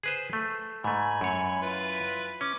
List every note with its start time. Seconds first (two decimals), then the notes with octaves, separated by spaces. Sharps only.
0.03 G#4 B4 C5
0.33 A3
0.84 G#2 A3 G#5 B5
1.21 F#2 C#5
1.62 E4 F4 B4
2.41 C#4 D6